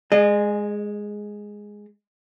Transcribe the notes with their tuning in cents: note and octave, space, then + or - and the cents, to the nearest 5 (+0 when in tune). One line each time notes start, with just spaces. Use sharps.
G#3 +0 G#4 +0 D#5 -35